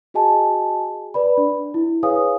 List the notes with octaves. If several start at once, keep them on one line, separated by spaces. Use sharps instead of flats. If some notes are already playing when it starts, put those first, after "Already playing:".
F#4 G#4 D#5 G#5 A5
B4 D5 B5
D4
E4
G#4 B4 C#5 F5 G#5 D#6